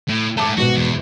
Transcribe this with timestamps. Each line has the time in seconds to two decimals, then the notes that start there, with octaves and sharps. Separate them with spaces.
0.09 A2
0.37 G#2 A3 A5 D6
0.57 G#1 B2 F#4
0.76 E2